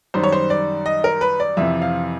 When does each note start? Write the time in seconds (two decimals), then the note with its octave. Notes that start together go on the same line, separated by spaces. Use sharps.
0.14 F#2 D#3 G3 C5
0.24 C#5
0.32 C5
0.50 D5
0.86 D#5
1.04 A#4
1.21 B4
1.40 D5
1.57 F2 C3 E3 E5
1.82 F5